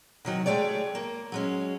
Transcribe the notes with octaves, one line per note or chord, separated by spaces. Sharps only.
C3 D#3 F#3
G#3 A3 G4 C#5 D5
A#3
F#3 G#3 C#4